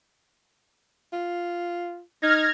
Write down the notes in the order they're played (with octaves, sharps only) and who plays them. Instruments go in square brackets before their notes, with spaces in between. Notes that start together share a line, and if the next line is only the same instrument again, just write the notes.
[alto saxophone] F4
[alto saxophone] D#4 [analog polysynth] F6 G#6 A#6